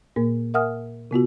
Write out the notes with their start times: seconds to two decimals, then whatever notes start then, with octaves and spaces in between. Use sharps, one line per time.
0.16 A#2 A#3 A#4
0.54 A#4 E5 F#5 G#5 D#6 F6
1.11 C3 B3 F4 F#4